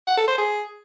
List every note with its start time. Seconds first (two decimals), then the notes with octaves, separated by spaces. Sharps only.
0.07 F#5
0.18 A4
0.28 C5
0.38 G#4